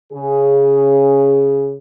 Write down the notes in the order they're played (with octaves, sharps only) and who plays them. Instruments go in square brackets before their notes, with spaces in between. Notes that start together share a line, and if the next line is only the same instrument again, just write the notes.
[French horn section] C#3 G#4